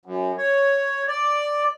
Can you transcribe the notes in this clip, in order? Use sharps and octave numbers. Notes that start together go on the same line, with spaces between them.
F#2
C#5
D5